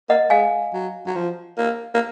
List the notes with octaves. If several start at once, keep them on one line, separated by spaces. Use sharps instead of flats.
A#3 D#5 F#5
G#3 F5 G#5
F#3
F#3
F3
A#3
A#3